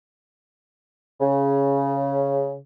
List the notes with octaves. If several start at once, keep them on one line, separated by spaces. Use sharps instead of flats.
C#3